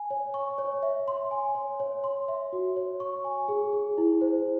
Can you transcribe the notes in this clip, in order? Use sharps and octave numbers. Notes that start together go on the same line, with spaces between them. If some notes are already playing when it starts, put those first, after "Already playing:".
Already playing: G#5
C#5
C#6
C#5
E5
C6
G#5
C#5
C#5
C6
E5
F#4
C#5
C#6
G#5
G#4
G#4
E4
C5